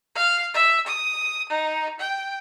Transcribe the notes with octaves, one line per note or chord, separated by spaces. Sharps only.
F5
E5
D#6
D#4
G5